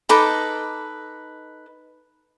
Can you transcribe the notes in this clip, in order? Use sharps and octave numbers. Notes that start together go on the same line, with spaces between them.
D#4 A4 B4 D6